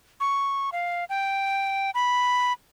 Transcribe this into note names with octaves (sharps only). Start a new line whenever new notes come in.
C#6
F5
G5
B5